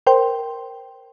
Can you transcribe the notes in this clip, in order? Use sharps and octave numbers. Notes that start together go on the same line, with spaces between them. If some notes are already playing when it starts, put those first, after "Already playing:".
A#4 C5 G5 C6